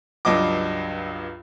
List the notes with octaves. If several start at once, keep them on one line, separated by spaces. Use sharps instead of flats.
C#2 G2 F#3 D#5 D6